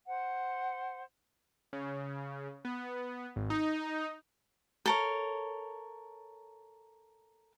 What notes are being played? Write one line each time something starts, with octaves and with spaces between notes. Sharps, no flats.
C5 F#5
C#3
B3
G#1
D#4
A4 A#4 C#5